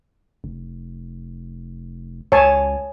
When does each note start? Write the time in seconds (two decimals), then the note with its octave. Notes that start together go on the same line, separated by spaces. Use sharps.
0.44 F1
2.32 C#2 C#5 G#5 A5